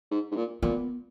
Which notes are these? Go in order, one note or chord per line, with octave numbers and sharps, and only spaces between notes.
G#2
G#2
A#2
A#2 B3